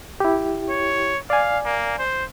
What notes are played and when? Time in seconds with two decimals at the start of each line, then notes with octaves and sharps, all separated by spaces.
0.20 E4 G4
0.70 C#5
1.30 D5 F5 G#5
1.66 A#3
1.99 C5